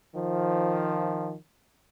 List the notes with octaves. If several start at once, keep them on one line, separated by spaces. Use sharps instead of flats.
D#3 F3